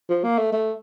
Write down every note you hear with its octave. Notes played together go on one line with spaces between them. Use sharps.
F3
A#3
A3
A3